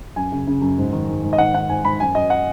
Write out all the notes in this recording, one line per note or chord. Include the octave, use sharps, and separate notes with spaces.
F#2 G#5
C#3
C#3
F#2
G#2
D#3
G#2
G#2
D#5
D#3 F#5
D#3 F#5
G#2 G#5
G#2 B5
F#2 G#5
F#2 D#5
F#5